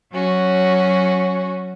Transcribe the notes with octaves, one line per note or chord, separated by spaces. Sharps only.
F#3 C#4 F#4